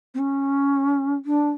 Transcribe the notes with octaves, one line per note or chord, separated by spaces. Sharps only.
C4
C#4
D4